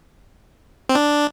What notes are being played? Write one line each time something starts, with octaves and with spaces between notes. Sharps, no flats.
C4
D4